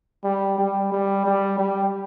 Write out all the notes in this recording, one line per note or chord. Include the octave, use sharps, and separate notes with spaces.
G3
G3
G3
G3
G3